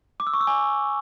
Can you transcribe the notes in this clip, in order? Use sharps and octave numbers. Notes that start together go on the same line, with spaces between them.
D6
E6
C#6
E6
G#5